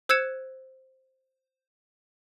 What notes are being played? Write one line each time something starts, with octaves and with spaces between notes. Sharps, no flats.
C5 E6 F#6 G#6 C#7 E7